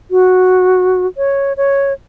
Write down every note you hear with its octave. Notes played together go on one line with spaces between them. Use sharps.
F#4
C#5
C#5